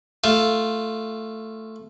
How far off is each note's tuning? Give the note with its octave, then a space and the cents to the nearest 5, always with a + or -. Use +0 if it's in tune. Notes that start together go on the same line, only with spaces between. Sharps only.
A3 +5 F4 +0